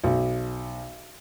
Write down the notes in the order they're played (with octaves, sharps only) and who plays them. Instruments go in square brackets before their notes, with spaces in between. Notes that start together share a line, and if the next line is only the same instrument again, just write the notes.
[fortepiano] B1